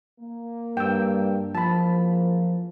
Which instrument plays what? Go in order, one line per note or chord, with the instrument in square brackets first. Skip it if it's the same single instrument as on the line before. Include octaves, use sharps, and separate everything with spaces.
[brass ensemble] A#3
[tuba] G2 [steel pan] G5 E6
[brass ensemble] F#1 E2 A#3 [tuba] F3 [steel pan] A5 B5